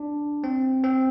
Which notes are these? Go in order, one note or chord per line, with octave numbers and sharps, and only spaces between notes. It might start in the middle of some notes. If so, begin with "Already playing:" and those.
Already playing: D4
C4
C4